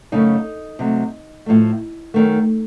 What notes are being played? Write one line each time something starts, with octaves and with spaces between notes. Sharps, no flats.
F#2 C#3 A3 D#4
C3 F#3 A3
A2 F3 A3
F#2 D#3 A3